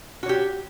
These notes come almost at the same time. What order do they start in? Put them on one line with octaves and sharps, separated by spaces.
F#4 C#5 G4